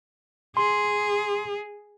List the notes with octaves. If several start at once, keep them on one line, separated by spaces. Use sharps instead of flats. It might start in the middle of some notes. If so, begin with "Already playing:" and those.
G#4 C6